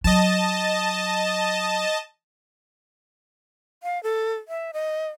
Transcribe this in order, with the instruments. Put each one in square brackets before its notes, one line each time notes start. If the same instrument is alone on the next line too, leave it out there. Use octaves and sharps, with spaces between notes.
[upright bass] F#3 [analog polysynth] D#5 A5
[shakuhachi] F5
A4
E5
D#5